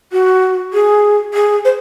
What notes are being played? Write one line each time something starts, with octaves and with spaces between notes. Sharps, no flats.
F#4
G#4
G#4
C5